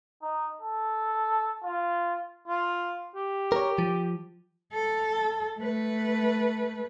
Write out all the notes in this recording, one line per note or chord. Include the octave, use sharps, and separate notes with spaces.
D#4
A4
F4
F4
G4
A#4 C#5
F3
A4
A3 B4